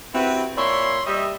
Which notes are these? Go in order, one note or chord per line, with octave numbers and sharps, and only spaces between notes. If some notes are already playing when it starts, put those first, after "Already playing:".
C4 E4 F#4 G4 B4
A#2 C#5 D5 E5 B5 C6
G3 D#5 E5